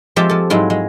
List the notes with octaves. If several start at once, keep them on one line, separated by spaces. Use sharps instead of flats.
F3 G#3 C4 G4 E5 A5
F3 A4
G#2 F#3 G#3 E4 F4
G#3